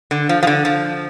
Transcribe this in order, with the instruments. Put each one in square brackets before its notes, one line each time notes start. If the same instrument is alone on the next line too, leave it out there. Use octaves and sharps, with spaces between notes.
[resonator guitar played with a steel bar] D3
F3
F3
D3
F3